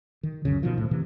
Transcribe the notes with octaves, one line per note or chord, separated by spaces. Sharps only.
D#3
C#2 F#2 C#3
B2 D#3 F3
A2
C3 E3